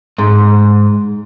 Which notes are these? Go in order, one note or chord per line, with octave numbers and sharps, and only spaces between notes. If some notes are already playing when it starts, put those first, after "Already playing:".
G#2